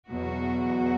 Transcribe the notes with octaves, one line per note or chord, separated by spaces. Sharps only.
E2 B2 F#3 F#4